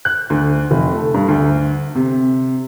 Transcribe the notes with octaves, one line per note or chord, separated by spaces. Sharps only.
F#6
D2
F1
A3
G2
D2
C3